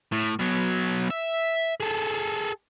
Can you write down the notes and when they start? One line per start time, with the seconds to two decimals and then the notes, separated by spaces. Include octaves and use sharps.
0.12 A2
0.40 B2 F#3
1.10 E5
1.80 G#4 A4